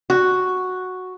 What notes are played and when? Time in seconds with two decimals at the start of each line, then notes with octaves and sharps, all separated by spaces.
0.10 F#4